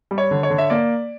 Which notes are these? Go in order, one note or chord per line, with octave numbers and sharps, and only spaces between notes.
G3
C#5
D3
C#5
D3
E5
A#3 D5